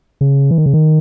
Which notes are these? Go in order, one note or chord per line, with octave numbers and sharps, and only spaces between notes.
C#3
E3
D#3
C#3
D#3